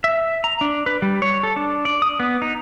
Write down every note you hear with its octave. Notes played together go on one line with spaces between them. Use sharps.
E5
A#5
D4
B4
G3
C#5
A4
D4
D5
D#6
B3
D#4